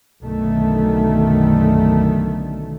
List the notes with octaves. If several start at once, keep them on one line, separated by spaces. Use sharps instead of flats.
B1 F#2 D3 D#3 A3